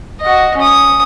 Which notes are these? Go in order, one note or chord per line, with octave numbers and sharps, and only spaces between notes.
F#4 D#5
C#4 D#6